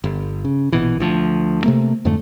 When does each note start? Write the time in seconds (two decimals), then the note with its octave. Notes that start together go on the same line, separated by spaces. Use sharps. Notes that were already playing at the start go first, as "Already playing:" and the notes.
0.04 G1
0.44 C#3
0.72 A#1 B2 E3
1.00 D2 F3
1.64 C3 A3 A#3
2.05 F2 G#2 D3 A3